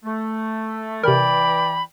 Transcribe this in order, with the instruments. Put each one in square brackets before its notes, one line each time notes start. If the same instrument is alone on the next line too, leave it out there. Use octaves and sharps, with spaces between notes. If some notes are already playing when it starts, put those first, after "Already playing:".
[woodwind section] A3
[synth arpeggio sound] C3 A#4 [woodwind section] E3 D5 G5 [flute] B5